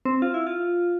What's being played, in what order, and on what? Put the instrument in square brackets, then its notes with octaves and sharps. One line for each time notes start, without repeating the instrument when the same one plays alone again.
[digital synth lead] C4
F4
E4
F4